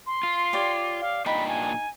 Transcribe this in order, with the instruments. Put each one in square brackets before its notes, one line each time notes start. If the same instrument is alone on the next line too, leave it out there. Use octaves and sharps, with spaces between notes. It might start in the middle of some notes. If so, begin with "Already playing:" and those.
[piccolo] C6
[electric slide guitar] F4
[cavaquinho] G4 C#5 D5
[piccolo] F5
[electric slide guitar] A#2 D4 G5 [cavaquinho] D#4 [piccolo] B5
[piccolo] G#5